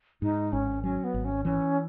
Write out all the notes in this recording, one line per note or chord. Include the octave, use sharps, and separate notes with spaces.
G#2 D#4
G#1 C#4
F#3 C#4
B3
G#1
C#4
E3 C#4